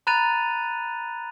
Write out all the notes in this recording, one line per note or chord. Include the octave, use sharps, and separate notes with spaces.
A#5 B5 F#6 A6 D#7 F7